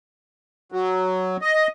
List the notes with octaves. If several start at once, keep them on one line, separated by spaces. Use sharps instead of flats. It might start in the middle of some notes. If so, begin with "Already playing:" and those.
F#3
D#5